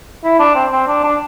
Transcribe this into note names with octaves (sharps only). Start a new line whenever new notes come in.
E4
D4
C4
C4
D4
D4